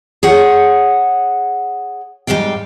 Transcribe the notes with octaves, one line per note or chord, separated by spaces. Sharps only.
G#4 C#5 F#5
G#2 F#3 G3 F5 G5